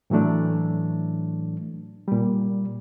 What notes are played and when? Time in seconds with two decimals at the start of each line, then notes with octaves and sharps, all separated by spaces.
0.10 A2 E3 F#3 A3 D4
2.08 A#2 G3